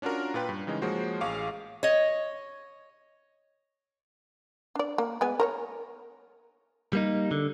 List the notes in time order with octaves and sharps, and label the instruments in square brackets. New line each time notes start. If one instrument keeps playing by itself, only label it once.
[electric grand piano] C#4 D4 F4 F#4 A#4
A#2 F4 B4 G5
G2
C#3 E3 G#3 D#4
F3 G#3 A#3 F#4 C5 C#5
A1 G#4 F5 C#6 D6
[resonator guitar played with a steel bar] C#5 D#5
[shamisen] D4 D5
A#3
G#3 B3 G#5
A#4 C5 C#5
[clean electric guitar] G3 A#3 D#4
D3